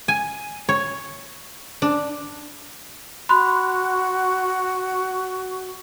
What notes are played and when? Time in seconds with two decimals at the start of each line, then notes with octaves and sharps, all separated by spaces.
0.08 G#5
0.69 C#5
1.82 D4
3.29 F#4 B5 C6 F#6